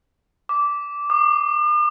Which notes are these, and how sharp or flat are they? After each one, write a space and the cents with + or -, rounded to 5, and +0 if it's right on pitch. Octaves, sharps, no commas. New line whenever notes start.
D6 -15
D6 +45